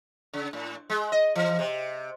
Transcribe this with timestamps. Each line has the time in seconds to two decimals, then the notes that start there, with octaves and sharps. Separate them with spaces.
0.34 C#3
0.53 A2
0.90 G#3
1.12 D#5
1.36 E3
1.59 C3